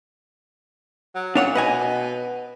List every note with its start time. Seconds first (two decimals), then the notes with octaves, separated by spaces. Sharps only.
1.15 F#3
1.35 A#2 D4 C#5 F#5
1.55 B2 B4 D#5 G#5